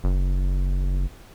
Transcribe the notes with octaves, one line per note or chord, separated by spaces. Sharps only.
F#1